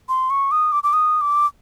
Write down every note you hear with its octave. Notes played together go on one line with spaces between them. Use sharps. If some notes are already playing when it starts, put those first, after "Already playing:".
C6
C#6
D#6
D6
D6
D#6
D6